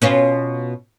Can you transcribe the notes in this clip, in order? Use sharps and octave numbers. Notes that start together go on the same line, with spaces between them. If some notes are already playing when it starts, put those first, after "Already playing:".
B2 C#4 F4